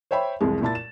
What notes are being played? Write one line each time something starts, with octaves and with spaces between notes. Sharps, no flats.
C5 C#5 E5 G5 B5
C2 F2 E3 G#3
A#2 E4 A5 A6
E7